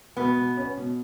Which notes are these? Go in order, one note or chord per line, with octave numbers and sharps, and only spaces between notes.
B2 B3
B2
C#4
B2